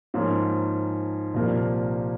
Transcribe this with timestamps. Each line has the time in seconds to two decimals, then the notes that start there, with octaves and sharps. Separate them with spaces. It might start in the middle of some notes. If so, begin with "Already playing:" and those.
0.14 G#2 F3 A#3 C#4
1.34 C2 A#2 F3 A#3